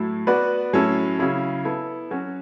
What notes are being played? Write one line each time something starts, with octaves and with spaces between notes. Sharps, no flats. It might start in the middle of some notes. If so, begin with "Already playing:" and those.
Already playing: A2 F#3 A3 E4
B3 F#4 B4 D5
A2 F#3 C#4 E4 A4
C#3 F#3 C#4 E4 G#4
B3 E4 A4
F#3 C#4 F#4